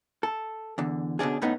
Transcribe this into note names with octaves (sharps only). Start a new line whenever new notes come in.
A4
E2 D3
B2 D3 C#4 D4 G#4
A2 A3 B3 C#4 D#4